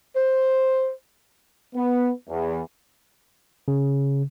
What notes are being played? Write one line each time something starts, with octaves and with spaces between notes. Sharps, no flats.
C5
B3
E2
C#3